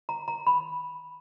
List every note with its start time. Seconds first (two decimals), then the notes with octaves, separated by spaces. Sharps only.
0.09 A#5
0.28 A#5
0.47 B5